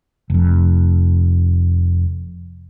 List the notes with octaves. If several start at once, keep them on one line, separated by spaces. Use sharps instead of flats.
F1 F2